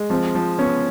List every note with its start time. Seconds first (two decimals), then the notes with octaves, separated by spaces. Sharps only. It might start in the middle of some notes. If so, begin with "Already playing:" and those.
Already playing: G#3
0.10 F3 C4
0.35 F3
0.58 B3 C#4